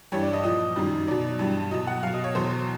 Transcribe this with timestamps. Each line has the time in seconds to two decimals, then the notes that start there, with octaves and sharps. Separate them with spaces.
0.12 G2 E3 G3 C#5
0.23 D5
0.33 D#5
0.43 A#2 F3 D#5
0.76 F#2 D#3 G3
1.07 B2 F#3 D5
1.39 G2 E3 G3
1.71 B2 F#3 D#5
1.87 F#5
2.03 F#3 F5
2.07 B2
2.14 D#5
2.24 C#5
2.35 E2 B2 F#3 C5